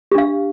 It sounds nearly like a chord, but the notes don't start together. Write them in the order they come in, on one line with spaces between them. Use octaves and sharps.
G4 D4 F5